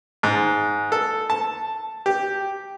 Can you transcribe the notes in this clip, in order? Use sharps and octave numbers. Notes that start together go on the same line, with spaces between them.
G#2
A4
A5
G4